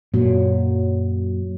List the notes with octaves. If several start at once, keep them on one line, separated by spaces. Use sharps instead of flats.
F#2 A#2 F#3